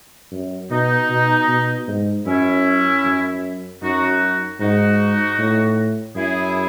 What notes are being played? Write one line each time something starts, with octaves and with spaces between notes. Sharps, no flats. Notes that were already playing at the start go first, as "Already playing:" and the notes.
F#2
B2 D#4
B2
B2
G#2
F#2 C#4 E4
F#2
F#2 D#4 F#4
G#2 D#4 F#4
A2
F#2 E4 G#4